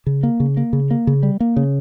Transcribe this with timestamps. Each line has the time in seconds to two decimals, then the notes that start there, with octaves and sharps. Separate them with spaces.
0.07 C#3
0.23 A#3
0.40 C#3
0.57 A#3
0.73 C#3
0.91 A#3
1.07 C#3
1.23 G3
1.40 A#3
1.56 C#3